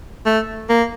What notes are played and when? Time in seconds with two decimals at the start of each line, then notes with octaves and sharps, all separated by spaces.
0.26 A3
0.70 A#3